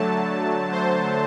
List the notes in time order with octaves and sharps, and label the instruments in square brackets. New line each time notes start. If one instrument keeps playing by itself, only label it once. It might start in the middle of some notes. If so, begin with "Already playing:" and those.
Already playing: [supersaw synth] D3 F#3 A3 A5
C5